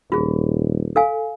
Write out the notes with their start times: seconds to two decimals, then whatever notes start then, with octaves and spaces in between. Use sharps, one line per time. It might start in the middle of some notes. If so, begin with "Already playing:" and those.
0.12 D#1 F4 G#4
0.96 A4 F5 G#5